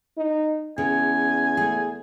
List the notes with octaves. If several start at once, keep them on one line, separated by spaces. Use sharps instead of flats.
D#4
E2 C#3 G#5
A3 G#4